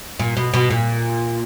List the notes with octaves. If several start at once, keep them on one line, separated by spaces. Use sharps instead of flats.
A#2
B2
B2
A#2